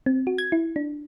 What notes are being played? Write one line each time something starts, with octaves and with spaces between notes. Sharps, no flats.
C4
F#4
G#6
E4
D4